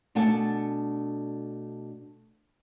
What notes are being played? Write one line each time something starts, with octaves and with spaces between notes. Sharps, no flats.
B2 A3 D4 F#5 G#5 A5